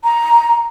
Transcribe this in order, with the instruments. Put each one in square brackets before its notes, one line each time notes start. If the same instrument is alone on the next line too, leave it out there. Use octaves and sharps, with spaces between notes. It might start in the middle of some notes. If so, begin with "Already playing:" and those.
[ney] A#5